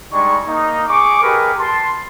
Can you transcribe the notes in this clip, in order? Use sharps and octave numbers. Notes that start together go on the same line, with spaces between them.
G3 G#3 D4 D#4 C#6
A#3 D#4
G#4 C#6 D6
D#4 G4 G#4 A#4 B4
A5 C6